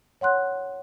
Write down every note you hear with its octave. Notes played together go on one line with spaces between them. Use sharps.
C#5 F#5 C6 F#6